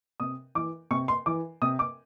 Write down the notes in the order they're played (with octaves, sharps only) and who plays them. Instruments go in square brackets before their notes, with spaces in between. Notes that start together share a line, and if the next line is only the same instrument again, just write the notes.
[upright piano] C3 D#6
E3 D6
C3 C#6
C6
E3 D6
C3 D#6
D6